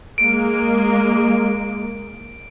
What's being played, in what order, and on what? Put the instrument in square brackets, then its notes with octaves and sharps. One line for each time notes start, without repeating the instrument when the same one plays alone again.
[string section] G#3 A#3 [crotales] D7